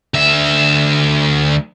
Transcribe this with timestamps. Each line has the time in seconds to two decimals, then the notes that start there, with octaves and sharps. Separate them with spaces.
0.14 D2 E5